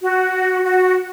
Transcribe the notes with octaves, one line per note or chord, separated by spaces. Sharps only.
F#4
F#4